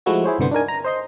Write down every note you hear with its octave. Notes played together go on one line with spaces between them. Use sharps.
F3 G#3 A3 E4 F#4
E4 G#4 C5 C#5
G1 C2 D3 B3 C5
D4 D#4 A#4 G#5
A#5
C5 D#5 C6